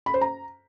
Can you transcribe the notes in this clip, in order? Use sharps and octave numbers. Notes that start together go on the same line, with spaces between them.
B5
C5
A#5